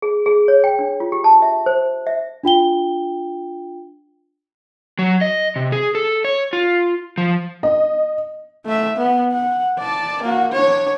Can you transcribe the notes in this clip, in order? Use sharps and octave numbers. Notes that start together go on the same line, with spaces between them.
G#4
G#4
C#5
G5
D4
F4
G4
A5
E5
C5
E5
D4 F4 G5 G7
F#3
D#5
C3
G#4
A4
C#5
F4
F3
D#5
A3 E5
B3
F#5
D5 A5
A#3 F#4
D4 C#5